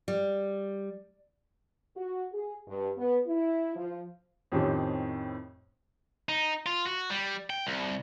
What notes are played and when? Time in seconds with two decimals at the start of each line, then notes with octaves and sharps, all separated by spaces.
0.08 G3
1.96 F#4
2.33 G#4
2.67 G2
2.97 B3
3.27 E4
3.76 F3
4.52 F2 A2 D#3 C4 C#4 G4
6.29 D#4
6.66 F4
6.87 F#4
7.10 G3
7.50 G5
7.67 C2